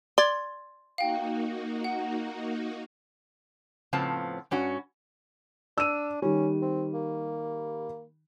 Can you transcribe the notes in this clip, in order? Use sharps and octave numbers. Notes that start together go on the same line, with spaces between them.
D5 C6 G#6 A6
A#3 D#4 F#4 F5 G5
F#5
A2 C#3 F3 B3 C4 A5
G2 C#4 F#4
D4 E6 D#7
D#3 G3 C#4
C4
A#3